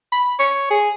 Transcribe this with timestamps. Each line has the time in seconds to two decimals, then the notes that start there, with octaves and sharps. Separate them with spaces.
0.12 B5
0.39 C#5
0.71 G#4